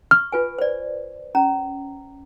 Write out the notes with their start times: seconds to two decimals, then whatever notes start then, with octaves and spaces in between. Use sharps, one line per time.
0.11 C#6 F6
0.32 F4 B4 G#5
0.59 C5 D5
1.35 C#4 A#5